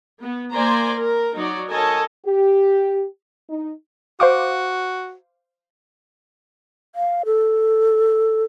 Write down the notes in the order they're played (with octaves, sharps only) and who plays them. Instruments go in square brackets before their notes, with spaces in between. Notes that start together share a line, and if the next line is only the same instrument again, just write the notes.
[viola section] B3
A#3 C5 D5 G#5 A#5 C6
A#4
F#3 D#4 C#5 D5
A4 A#4 C#5 D#5 G#5 A5
[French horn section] G4
D#4
[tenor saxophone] F#4 [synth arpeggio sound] C5 F5 D6
[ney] F5
A4